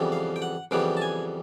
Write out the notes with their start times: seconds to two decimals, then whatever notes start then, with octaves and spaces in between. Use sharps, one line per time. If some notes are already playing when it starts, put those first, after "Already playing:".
Already playing: F2 C#3 E3 G3 B3
0.12 F5
0.36 G5
0.42 F#5
0.71 F2 C#3 E3 G3 B3 G5
0.97 A5
1.02 G#5